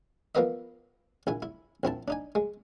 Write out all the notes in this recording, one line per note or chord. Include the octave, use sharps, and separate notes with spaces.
F3 A#3 B3 B4 D#5 E5
A#1 E4 G#5
E4
A#1 C4 E4 A5
D4 D#4 G#5
G#3